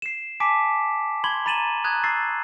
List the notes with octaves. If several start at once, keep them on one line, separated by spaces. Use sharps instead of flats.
C7 E7
G#5 A5 D6 B6 D7
B5 C6 G#6 F#7 G7
A#5 B5 A6 D#7 E7 F#7
A#5 D#6 F#6 G#6
C#6 E6 A6 C7